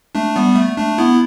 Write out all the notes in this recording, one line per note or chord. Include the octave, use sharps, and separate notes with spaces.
A3 D4
G3 B3
A3
A3 D4
B3 E4